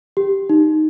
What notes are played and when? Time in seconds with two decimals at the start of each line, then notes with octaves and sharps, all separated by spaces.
0.17 G4
0.49 D#4